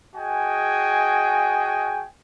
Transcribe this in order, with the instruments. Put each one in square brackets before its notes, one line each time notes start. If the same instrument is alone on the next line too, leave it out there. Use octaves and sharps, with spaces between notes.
[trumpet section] F#4 G#4 D#5 G5 G#5